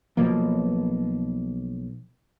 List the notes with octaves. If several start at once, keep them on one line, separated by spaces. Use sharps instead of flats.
B1 B2 F3 A#3